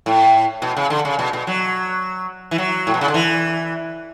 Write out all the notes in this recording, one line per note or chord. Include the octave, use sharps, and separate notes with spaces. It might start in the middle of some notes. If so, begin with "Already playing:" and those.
A2
B2
C#3
D3
C#3
B2
B2
F#3
E3
F#3
A2
B2
C#3
D3
E3